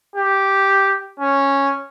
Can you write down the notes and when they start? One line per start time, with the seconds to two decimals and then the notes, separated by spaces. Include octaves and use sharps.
0.15 G4
1.19 C#4